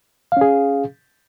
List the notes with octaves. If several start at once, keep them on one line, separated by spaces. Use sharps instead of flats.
C#4 G#4 F5